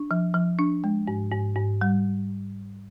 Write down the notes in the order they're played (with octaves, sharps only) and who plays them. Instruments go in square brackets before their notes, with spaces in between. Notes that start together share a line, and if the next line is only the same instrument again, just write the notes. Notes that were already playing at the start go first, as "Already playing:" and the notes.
Already playing: [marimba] D4
F3
F3
D4
G#3
G#2
G#2
G#2
G3